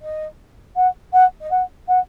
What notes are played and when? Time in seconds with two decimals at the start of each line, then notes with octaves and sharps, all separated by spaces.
0.02 D#5
0.76 F#5
1.13 F#5
1.41 D#5
1.51 F#5
1.88 F#5